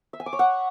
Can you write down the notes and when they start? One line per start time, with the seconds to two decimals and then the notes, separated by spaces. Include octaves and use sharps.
0.13 E5
0.20 G#5
0.26 D6
0.33 C#5
0.39 F#5